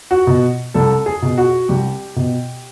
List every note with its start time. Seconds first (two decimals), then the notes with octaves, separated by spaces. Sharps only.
0.11 F#4
0.27 B2
0.74 C2 A4
1.06 G#4
1.22 B2
1.38 F#4
1.69 C2 G4
2.16 B2